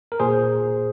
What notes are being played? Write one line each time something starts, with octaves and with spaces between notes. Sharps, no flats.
A#4
A#2 G#4 C5